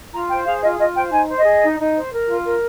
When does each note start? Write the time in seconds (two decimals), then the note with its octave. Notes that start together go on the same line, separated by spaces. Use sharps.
0.13 F4 A#5
0.29 C5 G5
0.46 G#4 F5
0.62 F4 D#5
0.79 F4 D#5
0.95 C5 G5
1.12 D#4 G#5
1.28 C5
1.37 D#5
1.45 G#4
1.62 D#4
1.78 D#4
1.95 C5
2.11 A#4
2.28 F4
2.44 A#4